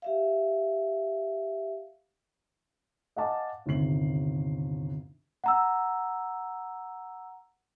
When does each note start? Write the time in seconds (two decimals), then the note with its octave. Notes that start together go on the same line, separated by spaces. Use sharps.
0.02 G4 E5 F5
3.16 D#5 F5 F#5 G#5 A5 D6
3.66 G1 D#2 C3 C7 F#7
5.44 F#5 A#5 E6